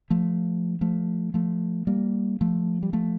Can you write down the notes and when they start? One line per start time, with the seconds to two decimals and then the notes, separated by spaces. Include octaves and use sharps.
0.10 F3 A3
0.81 F3 A3
1.34 F3 A3
1.87 G3 A#3
2.41 F3 A3
2.83 G3
2.93 F3 A3